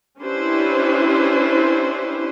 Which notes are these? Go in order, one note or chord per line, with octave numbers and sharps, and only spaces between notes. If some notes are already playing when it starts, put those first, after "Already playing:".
C#4 D4 E4 G4 B4 C5